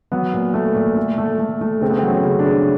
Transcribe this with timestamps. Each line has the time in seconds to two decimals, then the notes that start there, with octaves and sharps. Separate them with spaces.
0.12 F#3 B3
0.34 A#2
0.54 A3
0.75 A#2
0.97 A3
1.18 A3
1.39 A3
1.61 A3
1.81 C#3 C4
1.89 B3
1.98 C4
2.03 F#3
2.10 C#4
2.25 C#3
2.39 D4
2.46 C#3